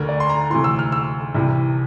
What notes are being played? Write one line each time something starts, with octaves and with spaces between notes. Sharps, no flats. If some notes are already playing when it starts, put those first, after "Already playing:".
Already playing: D2 D3 A#4
D5
C6
A#5
D2 C3 E3 C6
E6
F6
E6
C2 C3 E3